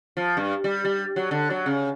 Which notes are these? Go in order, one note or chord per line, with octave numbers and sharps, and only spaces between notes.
F3
G2
G3
G3
F#3
D3
F#3
C#3